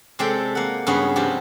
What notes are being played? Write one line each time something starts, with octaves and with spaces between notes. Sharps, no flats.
C3 G#3 G4 A4 D5 G5
A#3 F#5
G2 C#3 B3 F#4 G#4 B4
C3 F3 D4 G4